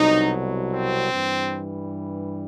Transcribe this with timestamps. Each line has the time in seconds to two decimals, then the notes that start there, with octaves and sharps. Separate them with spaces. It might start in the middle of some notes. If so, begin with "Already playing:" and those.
Already playing: C2 B2 F#3 D#4
0.71 C4
1.12 G2 E3 G3